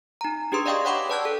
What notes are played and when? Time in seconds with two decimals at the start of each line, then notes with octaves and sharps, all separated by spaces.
0.21 D#4 A#5
0.52 D4 G4 G#4 B4 C6 D#6
0.66 D5 D#5 F5 G5 C#6 D#6
0.85 C#5 F#5 G5 B5 C#6 D6
1.09 B4 D5 A5 E6 F#6 G#6
1.25 A4